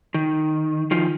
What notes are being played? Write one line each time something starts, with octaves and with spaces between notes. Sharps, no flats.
D#3
D#3 F3